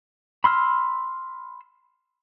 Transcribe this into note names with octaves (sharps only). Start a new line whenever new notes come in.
B5 C6 E6 F6